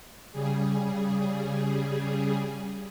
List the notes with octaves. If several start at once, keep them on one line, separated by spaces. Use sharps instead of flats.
C#3 G3 G#4